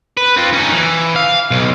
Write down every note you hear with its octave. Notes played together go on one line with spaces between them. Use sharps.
B4
C4 F4
C#4 D#4
E3
F5
B1